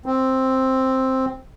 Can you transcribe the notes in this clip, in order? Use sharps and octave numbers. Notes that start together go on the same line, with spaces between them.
C4